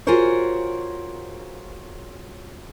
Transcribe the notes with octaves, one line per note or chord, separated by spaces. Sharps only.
F4 F#4 G#4 A#4 C5 C#5